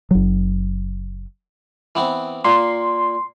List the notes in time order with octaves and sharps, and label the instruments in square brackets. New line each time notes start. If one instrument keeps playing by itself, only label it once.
[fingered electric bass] F#1 F#3
[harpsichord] E3 B3 C4
[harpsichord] A#2 A#3 [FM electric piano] C6